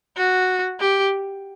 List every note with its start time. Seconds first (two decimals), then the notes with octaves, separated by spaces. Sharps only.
0.17 F#4
0.80 G4